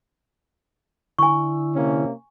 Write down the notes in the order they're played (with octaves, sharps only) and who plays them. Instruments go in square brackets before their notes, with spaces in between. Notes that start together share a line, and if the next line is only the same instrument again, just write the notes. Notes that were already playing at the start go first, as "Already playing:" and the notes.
[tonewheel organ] D3 E4 [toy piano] G#5 C#6
[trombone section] C3 A#3 C#4